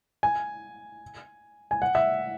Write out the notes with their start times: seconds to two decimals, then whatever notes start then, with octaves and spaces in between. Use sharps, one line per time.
0.23 G#5
1.71 G#5
1.82 F#5
1.95 E5